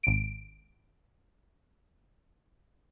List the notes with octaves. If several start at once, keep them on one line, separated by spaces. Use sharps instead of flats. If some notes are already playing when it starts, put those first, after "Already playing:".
G#1 D7